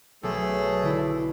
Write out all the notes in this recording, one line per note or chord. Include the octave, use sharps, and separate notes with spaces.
B1 A3 G#4 A4
D3 E4